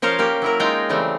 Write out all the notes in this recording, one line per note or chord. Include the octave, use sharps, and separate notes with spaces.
F3 C#4 A#4 C5 F5
A#3 C#4 G4
F#3 E4 A#4
G#3 D#4 F4 G5 G#5 A#5
C#3 E3 G3 A3 C4